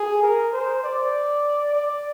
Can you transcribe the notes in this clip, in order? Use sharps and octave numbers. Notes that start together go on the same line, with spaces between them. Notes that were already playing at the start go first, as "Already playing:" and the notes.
Already playing: G#4
A#4
C5
D5
D5